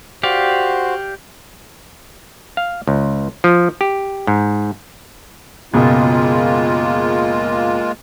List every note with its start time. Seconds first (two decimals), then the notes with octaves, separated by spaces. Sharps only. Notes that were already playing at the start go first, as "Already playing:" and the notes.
0.23 F#4 G4 C5 D5 F5
2.57 F5
2.87 C#2
3.44 F3
3.81 G4
4.27 G#2
5.74 F#1 B2 G#3 A#3 F4